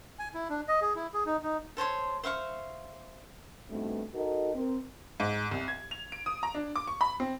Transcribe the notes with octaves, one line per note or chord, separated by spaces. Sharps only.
G#5
E4
D4
D#5
G#4
E4
G#4
D#4
D#4
A4 C5 C#5 C6
C5 E5 F5 C#6
G2 A3 B3 C4 D#4 F#4
D#4 F#4 A4 A#4 D#5
C4 A#4
G#2
C2
G#6
F7
D7
D#6
A#5
D4
D6
C#6
B5
C4